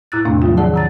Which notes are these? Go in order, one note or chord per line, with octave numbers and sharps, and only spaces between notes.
A2 E4 E6 F#6 A6
E2 A2 C3 A3 C4 D4
F3 F#3 A3 F4
D#3 F3 G#4 D5 F#5 A5
D#3 A#5 A6